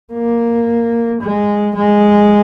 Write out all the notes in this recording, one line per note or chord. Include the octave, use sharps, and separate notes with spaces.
A#3
G#3
G#3